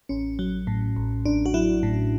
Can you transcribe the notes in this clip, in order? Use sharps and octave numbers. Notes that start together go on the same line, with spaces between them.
A1 C#4
F#3
A2
A1
A1 D4
F#4
F#3 E4
A2